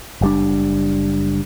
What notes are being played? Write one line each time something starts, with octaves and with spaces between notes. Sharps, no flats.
F#1 G3 D4